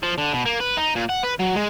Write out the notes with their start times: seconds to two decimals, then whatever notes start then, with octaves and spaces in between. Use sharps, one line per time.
0.03 F3
0.18 D3
0.33 B2
0.45 A#3
0.60 B4
0.77 D#4
0.95 A#2
1.09 F#5
1.23 B4
1.39 F#3
1.55 G#3